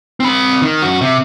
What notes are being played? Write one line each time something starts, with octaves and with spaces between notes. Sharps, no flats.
C4 B5
D#3
F#2 F#4
C3